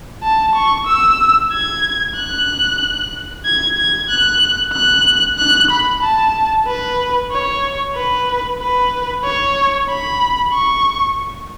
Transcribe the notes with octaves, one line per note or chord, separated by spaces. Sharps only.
A5
C#6
E6
G#6
F#6
G#6
G#6
F#6
F#6
F#6
B5
A5
B4
C#5
B4
B4
C#5
B5
C#6